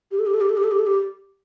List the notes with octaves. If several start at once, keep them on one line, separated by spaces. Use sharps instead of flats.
G4
A4
G4
A4
G4
A4
G4
A4
G4
A4
G4